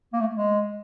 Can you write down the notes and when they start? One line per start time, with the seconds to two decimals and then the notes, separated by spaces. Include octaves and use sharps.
0.13 A#3
0.20 A3
0.35 G#3